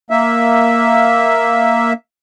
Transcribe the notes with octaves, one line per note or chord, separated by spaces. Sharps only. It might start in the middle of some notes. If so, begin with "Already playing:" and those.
A#3 E5